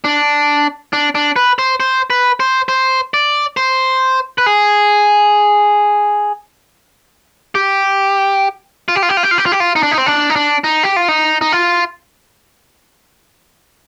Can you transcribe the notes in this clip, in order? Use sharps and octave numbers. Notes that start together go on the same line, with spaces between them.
D4
D4
D4
B4
C5
C5
B4
C5
C5
D5
C5
B4
G#4
G4
F4
G4
F4
G4
F4
G4
F4
G4
F4
G4
F4
D#4
D4
D#4
C4
D4
D#4
D4
D#4
G4
F4
D#4
D#4
F4